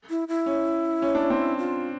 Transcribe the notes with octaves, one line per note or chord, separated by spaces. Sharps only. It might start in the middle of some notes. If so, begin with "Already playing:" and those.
E4
E4
C#4
C#4
D4
C#4
C4
F4